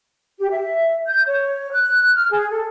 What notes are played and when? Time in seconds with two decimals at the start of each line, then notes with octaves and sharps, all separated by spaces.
0.39 G4
0.51 E5
1.07 G6
1.27 C#5
1.72 F#6
2.15 F6
2.32 G#4
2.50 A4